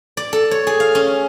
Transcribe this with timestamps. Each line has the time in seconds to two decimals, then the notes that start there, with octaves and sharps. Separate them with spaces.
0.17 D5
0.33 A4
0.51 C#5
0.67 G#4
0.80 F5
0.95 C#4